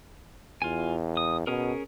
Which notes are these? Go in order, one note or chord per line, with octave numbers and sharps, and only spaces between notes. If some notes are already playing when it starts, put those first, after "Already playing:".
E2 F4 G#5
D#6
B2 C#4 G#4 A#4